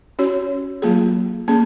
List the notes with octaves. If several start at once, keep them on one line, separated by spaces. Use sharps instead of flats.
C#4 F#4 C#5
F#3 A#3 F4 G#4
A#3 C#4 G#4